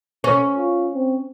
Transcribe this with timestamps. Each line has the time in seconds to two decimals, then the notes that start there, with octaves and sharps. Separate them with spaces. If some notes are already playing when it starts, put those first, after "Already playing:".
0.24 C#4
0.57 F4
0.94 C4